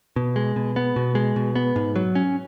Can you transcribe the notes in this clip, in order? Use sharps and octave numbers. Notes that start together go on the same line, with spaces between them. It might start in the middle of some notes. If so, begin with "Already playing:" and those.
B2
G#3
B2
B3
B2
G#3
B2
B3
G#2
F#3
C#4